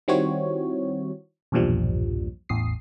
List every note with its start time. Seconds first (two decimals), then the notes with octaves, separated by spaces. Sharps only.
0.08 D#3 G3 C4 E4 F#4 C#5
1.52 B1 E2 G2 A#2 F3 G3
2.49 A1 E2 D#6 C7